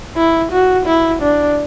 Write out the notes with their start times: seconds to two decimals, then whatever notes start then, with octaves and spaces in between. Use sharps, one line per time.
0.16 E4
0.52 F#4
0.86 E4
1.22 D4